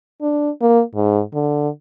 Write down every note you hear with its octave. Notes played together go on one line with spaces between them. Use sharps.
D4
A#3
G#2
D3